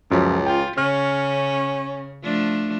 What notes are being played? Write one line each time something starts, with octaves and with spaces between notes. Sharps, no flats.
C#2 F#2 F3
F4 G5
C#3 C#4 F6
F3 A3 D4